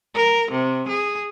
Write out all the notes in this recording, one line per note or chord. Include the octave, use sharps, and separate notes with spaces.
A#4
C3
G#4